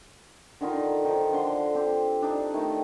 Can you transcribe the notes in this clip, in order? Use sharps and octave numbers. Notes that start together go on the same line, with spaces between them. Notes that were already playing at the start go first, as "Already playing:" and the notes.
D3 D#3 D#4 F4
D#3 F3
D3 C6
C4 G4
D4 D#4
D#3 A3